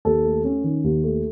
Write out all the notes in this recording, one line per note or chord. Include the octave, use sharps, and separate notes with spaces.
D#2 A4
A3
C#4
D#3
D#2
A3